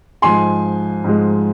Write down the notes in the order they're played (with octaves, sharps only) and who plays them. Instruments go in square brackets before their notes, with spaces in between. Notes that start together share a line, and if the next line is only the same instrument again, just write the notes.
[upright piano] G#2 F3 G#3 G#5 C6
G#2 F3 G#3